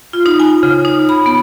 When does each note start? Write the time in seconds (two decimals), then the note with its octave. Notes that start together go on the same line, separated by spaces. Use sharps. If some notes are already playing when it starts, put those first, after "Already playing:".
0.13 F4
0.26 D#4
0.40 G#5
0.63 C#3
0.85 D#4
1.09 B5
1.26 B3